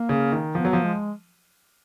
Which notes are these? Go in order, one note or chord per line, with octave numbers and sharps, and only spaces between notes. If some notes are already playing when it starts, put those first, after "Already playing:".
Already playing: A#3
C#3
D#3
F3 B3
F#3
F3
G#3